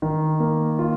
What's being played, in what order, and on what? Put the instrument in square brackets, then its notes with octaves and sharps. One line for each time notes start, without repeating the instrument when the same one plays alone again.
[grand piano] D#3
A#3
F4